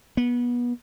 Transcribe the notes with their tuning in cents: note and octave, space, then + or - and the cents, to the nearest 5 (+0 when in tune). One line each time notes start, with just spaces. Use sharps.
B3 -25